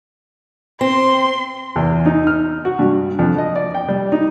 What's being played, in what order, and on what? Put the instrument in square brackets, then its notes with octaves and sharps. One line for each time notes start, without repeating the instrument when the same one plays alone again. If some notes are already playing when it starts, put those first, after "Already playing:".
[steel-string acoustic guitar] C4 [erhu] C6
[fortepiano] E2
D#4
F6
F#4
G2
F2
D#5
D5
G5
G3
D#4